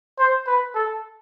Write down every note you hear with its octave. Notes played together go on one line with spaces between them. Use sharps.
C5
B4
A4